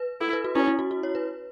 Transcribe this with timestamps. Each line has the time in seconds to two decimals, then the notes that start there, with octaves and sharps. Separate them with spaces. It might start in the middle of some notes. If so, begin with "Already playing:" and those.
Already playing: B4
0.21 E4 A4
0.33 B4
0.44 F#4
0.55 C#4 E4
0.68 E4
0.79 F#4
0.91 F#4
1.03 C#5
1.15 B4